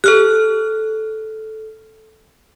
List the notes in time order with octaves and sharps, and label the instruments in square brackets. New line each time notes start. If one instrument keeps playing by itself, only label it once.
[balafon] G4 [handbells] A4 F6 F#6